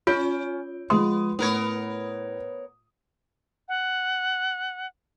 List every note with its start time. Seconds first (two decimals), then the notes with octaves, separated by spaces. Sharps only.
0.07 C#4 F4 G6 D7
0.90 F3 G#3 B3 C6 D#6
1.39 A2 B3 A#4 C#5
3.68 F#5